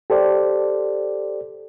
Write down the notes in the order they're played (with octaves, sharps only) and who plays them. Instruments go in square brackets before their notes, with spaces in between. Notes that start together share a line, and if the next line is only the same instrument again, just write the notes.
[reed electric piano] G4 A4 C5 D5